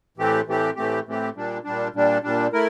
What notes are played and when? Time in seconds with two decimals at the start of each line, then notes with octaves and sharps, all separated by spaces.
0.17 A2 E3 A3 C4 G4
0.47 A2 E3 A3 C4 G4
0.76 A2 E3 A3 C4 G4
1.06 A2 E3 A3 C4 G4
1.36 A#2 G3 D4
1.64 A#2 G3 D4
1.94 A#2 G3 D4
2.24 A#2 G3 D4
2.53 A3 E4 A#4